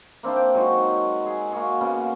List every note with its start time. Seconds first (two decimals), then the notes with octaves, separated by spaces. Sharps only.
0.23 A#3 C4 D4 E4
0.36 G5
0.54 F#3 G#3 D#4 F#4
1.26 G#4
1.52 A#3 F#4 G#4
1.81 C#3 A#3 B3